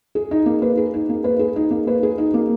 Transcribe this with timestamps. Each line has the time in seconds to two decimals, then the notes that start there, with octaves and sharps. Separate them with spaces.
0.15 G#4
0.31 D#4
0.46 A#3
0.62 B4
0.77 G#4
0.94 D#4
1.09 A#3
1.24 B4
1.39 G#4
1.56 D#4
1.71 A#3
1.87 B4
2.03 G#4
2.18 D#4
2.34 A#3